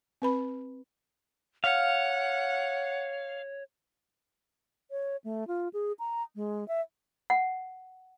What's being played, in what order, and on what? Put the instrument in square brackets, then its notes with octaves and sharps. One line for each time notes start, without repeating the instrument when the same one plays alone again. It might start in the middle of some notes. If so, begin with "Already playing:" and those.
[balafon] C4 B4 B5
[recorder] C#5 [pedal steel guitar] F5 [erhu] F#5
[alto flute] C#5
A3
F4
G#4
A#5
G#3
E5
[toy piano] F#5